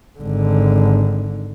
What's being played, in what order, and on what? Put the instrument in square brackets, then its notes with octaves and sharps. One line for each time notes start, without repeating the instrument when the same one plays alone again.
[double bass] G#1 D3